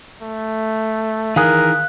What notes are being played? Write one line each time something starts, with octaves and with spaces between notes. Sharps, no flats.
A3
D#3 E3 G#4 A#4 F5 F#6